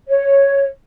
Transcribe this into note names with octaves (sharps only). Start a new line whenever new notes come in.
C#5